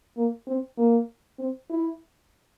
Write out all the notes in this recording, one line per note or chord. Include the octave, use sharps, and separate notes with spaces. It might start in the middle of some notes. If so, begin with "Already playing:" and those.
A#3
C4
A#3
C4
E4